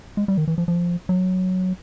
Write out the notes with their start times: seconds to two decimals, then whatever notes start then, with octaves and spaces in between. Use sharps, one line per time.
0.17 G#3
0.28 G3
0.37 D#3
0.48 E3
0.58 F3
0.68 F3
1.09 F#3